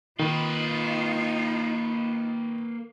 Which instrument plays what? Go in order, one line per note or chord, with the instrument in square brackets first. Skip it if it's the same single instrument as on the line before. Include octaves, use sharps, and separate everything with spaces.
[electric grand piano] D#3 [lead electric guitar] A#3 B4 [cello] D#4 F4